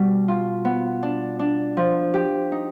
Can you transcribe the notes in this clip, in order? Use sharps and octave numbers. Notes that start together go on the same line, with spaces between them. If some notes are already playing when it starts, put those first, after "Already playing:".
Already playing: B2 G3
F4
B3
D4
D4
F3
G4
D#4